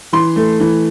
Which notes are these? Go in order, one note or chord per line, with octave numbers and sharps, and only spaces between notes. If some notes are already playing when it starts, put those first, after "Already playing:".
E3 C6
A3
E3